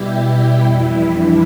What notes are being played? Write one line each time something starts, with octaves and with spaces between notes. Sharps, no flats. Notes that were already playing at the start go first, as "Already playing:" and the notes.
Already playing: B2 G3 E4 G4
F2 E3 G3 E4
D4